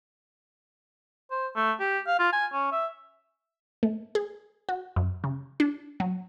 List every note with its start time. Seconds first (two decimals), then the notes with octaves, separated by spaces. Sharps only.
1.31 C5
1.56 A3
1.80 G4
2.07 F5
2.19 F4
2.32 G#5
2.53 C#4
2.72 E5
3.83 A3
4.15 G#4
4.69 F#4
4.96 F#2
5.24 C#3
5.60 D4
6.00 F#3